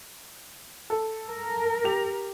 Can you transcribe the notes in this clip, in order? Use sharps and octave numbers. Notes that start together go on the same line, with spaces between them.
A4
A#4
G4 F7